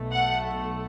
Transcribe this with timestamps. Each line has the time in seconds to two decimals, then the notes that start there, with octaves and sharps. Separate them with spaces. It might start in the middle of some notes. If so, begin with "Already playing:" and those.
Already playing: B1 B2 A3
0.11 F#5